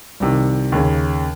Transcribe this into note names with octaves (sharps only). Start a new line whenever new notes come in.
C2 C3 D#3
D#2 C#3